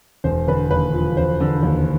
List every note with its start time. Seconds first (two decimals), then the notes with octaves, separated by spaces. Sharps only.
0.24 E1 C5
0.47 D3 B4
0.71 D#2 B4
0.94 F3
1.17 E1 C5
1.40 D3
1.63 D#2